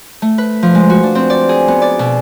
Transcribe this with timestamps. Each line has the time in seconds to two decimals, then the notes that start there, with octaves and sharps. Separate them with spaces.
0.22 A3
0.38 B4
0.63 F3
0.75 G#3
0.90 F#4
1.03 D4
1.15 C4
1.30 D5
1.49 G#4
1.68 B3
1.82 D5
1.99 B2